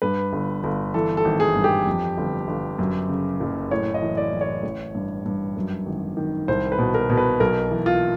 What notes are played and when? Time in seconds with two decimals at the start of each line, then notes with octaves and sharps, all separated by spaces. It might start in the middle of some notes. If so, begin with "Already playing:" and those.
0.02 G2 B4
0.33 G1
0.64 G1
0.94 E3 A4
1.17 A4
1.25 G#1
1.40 G#4
1.55 G2
1.64 G4
1.87 F2
2.18 G1
2.48 G1
2.79 F#2
3.09 C#3
3.40 F#1
3.71 A2 C#5
3.94 D#5
4.02 E3
4.17 D5
4.33 E3
4.41 C#5
4.63 A1
4.95 G2
5.26 G2
5.56 F#2
5.86 G#1
6.17 D#3
6.48 C2 C5
6.72 B4
6.79 B2
6.94 A#4
7.10 B2
7.17 B4
7.40 B1 A#4
7.71 E3
7.86 F4